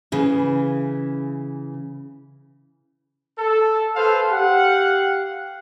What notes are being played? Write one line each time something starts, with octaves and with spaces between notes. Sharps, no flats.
C#3 E3
A4
A4 B4 C5 F5
G4 F5 F#5